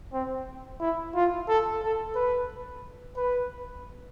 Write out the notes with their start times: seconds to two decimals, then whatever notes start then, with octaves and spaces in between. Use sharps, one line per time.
0.13 C4
0.80 E4
1.15 F4
1.48 A4
1.82 A4
2.15 B4
3.16 B4